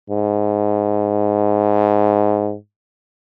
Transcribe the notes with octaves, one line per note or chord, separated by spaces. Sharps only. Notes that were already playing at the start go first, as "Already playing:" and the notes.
G#2